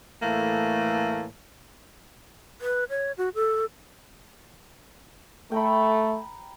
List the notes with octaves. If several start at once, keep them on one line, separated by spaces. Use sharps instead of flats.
A2 E3 A3 A#3
B4
C#5
F#4
A4
A3 G5 A#5 B5